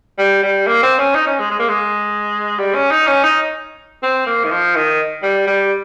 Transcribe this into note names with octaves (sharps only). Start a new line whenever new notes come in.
G3
G3
A#3
C4
C#4
D#4
C#4
G#3
G#3
A#3
G#3
G3
C#4
D#4
C#4
D#4
C4
A#3
D#3
F3
D#3
G3
G3